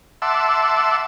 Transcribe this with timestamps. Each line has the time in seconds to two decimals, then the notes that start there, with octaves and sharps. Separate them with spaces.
0.22 E5 F#5 A5 C6 D6 E6